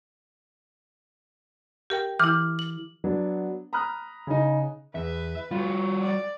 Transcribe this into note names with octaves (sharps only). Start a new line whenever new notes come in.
G4 A#4 G5
E3 E4 D6 F6
F#7
F#3 B3 D4
A#5 B5 D#6 F6 F#6
C#3 D#4
E2 B4 E5
G3 F4 F#4
D5